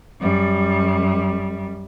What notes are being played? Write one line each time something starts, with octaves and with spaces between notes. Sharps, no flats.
F#2 G3